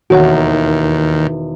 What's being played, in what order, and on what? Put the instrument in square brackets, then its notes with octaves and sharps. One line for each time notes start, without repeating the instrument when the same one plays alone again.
[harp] E1 D#3 [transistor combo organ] D#2 [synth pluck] F#4 C#5 F#5